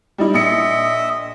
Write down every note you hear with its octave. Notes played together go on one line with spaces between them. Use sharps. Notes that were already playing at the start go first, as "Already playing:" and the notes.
G3 D#4 E4
A#1 D#5 E5 C#7